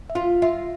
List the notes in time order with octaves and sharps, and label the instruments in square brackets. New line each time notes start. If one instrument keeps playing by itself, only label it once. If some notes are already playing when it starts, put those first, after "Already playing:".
[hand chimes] E5
[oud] F4 [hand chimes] F5
[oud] F4 [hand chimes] E5